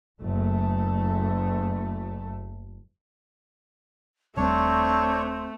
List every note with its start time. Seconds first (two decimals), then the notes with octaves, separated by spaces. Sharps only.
0.21 F#1 A3
4.37 D#1 G3 A3 C4 D4 C#5